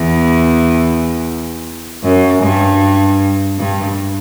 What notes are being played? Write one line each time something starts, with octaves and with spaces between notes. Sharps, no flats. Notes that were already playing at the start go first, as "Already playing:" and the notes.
Already playing: E2
F#2
G2
G2